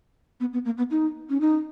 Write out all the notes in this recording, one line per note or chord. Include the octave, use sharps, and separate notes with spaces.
B3
B3
A#3
B3
D#4
C#4
D#4